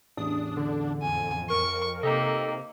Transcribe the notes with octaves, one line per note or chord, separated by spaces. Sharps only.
A1 E2 D4 D#6
D3
F2 G#5
A#4 C#6
C3 A#3 D#4 G4 A4 D#5